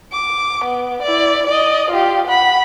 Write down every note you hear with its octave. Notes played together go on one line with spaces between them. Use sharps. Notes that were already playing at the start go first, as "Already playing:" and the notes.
D6
B3
E4 D5
D5 D#5
F4 G4
F#5 B5